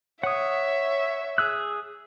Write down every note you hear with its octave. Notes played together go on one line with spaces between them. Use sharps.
C#5 E5 F#5 D#6
G#4 E6 F#6